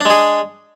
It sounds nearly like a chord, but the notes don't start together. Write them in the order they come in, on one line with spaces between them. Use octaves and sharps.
D4 G#3 G#4